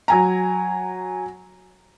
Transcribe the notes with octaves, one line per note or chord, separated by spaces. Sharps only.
F#3 G#5 A#5